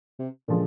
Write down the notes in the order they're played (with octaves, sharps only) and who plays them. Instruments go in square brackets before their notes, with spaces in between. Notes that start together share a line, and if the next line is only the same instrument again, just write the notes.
[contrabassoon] C3
[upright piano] A#2 F3 G#3 [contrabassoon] D3